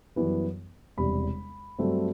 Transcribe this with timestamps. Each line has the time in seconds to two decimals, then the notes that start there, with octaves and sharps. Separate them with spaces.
0.16 F#2 E3 G3 B3
0.97 E1 E2 C3 G3 B5
1.78 G2 F#3 A3 C4